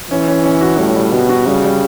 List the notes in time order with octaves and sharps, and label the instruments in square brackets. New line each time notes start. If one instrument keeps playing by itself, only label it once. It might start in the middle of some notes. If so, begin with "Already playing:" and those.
[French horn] E3 [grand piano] C#4
[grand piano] C#4
C#4
F#4
[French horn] A2 [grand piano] G3
[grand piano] G3
[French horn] B2 [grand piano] F#4
[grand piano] F#4
[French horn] C#3 [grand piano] G3
[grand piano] G3